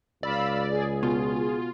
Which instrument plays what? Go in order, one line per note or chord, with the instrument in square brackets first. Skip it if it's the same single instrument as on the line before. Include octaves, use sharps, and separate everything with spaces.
[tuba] C#2 [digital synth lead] D5 [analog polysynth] F5 B5 E6
[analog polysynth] G#4
[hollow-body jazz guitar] B2 [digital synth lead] F4